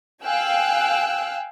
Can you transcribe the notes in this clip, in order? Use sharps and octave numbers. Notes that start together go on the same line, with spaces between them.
F5 G5 G#5 E6 F#6